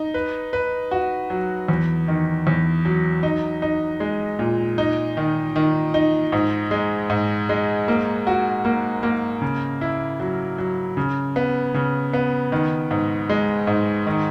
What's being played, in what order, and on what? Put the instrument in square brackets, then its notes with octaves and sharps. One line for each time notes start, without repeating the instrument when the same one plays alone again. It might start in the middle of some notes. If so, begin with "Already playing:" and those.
Already playing: [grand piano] D#4
B4
B4
F#4
F#3
E2
D#3
E2
F#3
D#4
D#4
G#3
A#2
D#4
D#3
D#3
D#4
G#2
G#3
G#2
G#3
A#3
F#4
A#3
A#3
C#3
E4
F#3
F#3
C#3
B3
C#3
B3
D#3
G#2
G#3
G#2
D#3